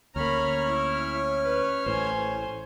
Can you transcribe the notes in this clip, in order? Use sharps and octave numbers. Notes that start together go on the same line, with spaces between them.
D2 A#3 C#4 C#5 A#5 B5 F6
E4
B4
A1 A2 C5 G#5